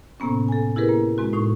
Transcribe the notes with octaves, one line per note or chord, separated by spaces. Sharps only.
A2 C3 A#3 B3 C#4
A4 G#5
E4 G4 G#4 A#4 B4
A#3
G#3 C4 F#4
A2 D#4 C#6